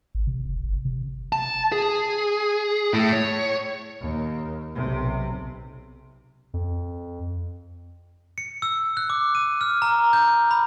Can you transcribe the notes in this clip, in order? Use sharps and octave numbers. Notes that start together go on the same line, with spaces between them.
G#1
C3
F1
G1
C3
A5
G#4
A2
C#5
D#2
B1 C3
F2
C#7
E6
F#6
D6
D#7
F6
A#5
G6
B5